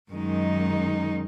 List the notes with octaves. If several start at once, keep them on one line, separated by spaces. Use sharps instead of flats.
F#2 D#3 G#3 D#4